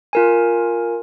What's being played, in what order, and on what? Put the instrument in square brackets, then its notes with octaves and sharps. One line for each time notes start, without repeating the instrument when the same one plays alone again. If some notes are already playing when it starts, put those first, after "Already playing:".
[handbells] F4 A#4 G#5